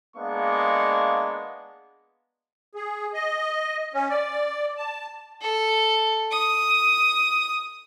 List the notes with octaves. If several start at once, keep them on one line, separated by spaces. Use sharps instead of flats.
G#3 A#3 B3 D4 F5 C#6
G#4
D#5
C#4
D5
A5
A4
D#6